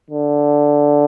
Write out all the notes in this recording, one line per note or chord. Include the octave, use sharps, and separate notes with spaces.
D3